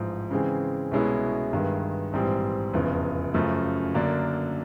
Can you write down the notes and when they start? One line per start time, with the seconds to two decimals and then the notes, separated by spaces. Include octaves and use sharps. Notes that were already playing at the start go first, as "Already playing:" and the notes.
Already playing: A1 G#2 F3
0.31 C#3 E3 G#3 C4
0.91 C2 B2 G#3 C#4 E4
1.53 G1 G2 D#3 G#3
2.13 A#1 G#2 E3 G3 C4
2.73 F1 E2 C#3 F3
3.34 F#2 C#3 F3 A3
3.94 F#2 D3 F#3 A#3 D4